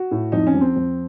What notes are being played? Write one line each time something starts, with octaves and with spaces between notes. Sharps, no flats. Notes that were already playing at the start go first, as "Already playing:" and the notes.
Already playing: F#4
A2
F2 D#4
C#4
F2
C4
F2